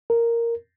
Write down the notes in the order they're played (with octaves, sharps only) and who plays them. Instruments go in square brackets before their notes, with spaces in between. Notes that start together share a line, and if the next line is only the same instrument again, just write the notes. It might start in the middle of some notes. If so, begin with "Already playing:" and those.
[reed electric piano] A#4